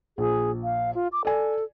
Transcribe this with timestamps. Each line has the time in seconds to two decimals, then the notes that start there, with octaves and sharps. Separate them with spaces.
0.18 A#1 G#4
0.64 F5
0.95 F4
1.12 D6
1.25 A4 D5 G#5